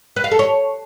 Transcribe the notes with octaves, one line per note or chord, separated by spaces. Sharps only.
B4
F5
A4
C#5